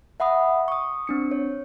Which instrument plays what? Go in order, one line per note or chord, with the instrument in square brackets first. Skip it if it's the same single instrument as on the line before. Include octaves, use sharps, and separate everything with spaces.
[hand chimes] E5 F#5 B5 D#6
C#6 D#6
C4 D4 C#7
C#5